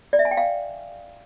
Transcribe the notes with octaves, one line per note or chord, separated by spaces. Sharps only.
D5
E5
G#5
G5
F5